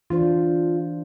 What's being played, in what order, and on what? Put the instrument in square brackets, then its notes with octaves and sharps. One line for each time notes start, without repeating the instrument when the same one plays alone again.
[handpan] E3 D4 C5 [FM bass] F4